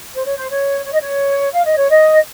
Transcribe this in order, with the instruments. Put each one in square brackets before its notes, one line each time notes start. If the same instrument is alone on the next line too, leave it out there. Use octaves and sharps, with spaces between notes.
[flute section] C5
C#5
C5
C#5
C#5
D#5
C#5
F5
D#5
C#5
D#5